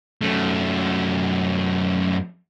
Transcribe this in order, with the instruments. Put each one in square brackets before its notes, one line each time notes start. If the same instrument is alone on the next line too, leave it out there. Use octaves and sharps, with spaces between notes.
[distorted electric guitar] F#2 A3